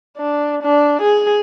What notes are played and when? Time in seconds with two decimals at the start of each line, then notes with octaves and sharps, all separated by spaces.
0.18 D4
0.63 D4
1.02 G#4